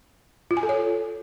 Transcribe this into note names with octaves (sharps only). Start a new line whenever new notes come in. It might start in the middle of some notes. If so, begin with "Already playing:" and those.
F4
G#5
A4
C#5